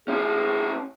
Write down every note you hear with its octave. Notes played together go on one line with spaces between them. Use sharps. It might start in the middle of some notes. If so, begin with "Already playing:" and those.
C#4 E4 G#4